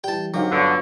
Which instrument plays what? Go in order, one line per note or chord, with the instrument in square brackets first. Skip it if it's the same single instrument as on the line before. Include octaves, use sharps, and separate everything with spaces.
[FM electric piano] E3 G3 [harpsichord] G5 A5
[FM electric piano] D3 D#3 C4 [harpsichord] F#3 [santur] G4 F5
[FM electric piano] G1 F4 [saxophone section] D3 [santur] B3 C#4